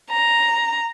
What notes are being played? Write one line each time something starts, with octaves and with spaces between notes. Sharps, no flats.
A#5